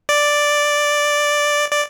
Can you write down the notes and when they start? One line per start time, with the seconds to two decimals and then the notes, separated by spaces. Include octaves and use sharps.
0.09 D5
1.72 D5